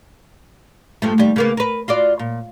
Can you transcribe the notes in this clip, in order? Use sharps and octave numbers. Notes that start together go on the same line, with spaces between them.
G2 F3 A3
D#2 G3
C#3 A#3 B3
A#4 B4
F4 F#4 D5
A#2